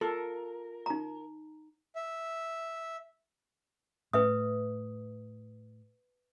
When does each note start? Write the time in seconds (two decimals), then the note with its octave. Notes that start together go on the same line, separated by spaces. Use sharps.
0.01 F4 A4 A#4
0.86 D#4 A#5
1.95 E5
4.13 A2 B4 E5 D#6